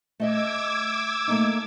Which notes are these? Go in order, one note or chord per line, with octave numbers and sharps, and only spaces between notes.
A3 D#5 E5 D6 E6 G#6
A3 A#3 D#4